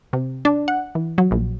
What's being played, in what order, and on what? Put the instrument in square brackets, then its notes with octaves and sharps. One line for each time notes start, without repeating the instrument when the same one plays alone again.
[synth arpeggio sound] C3
D4
F#5
E3
F#3
A#1